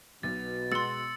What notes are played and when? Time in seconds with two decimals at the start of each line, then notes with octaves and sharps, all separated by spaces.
0.23 B1 B2 A6
0.72 G#3 F#4 C6 E6 A6 C#7